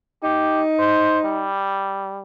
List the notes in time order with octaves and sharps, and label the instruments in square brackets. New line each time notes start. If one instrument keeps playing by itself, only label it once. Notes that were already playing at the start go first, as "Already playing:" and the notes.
[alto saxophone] D#4 [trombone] G4
[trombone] C5
G3